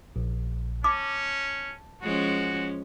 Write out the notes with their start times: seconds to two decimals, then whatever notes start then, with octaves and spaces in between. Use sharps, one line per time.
0.16 A#1
0.84 C#4 A5 D6
2.02 F3 G#3 C#4 F#4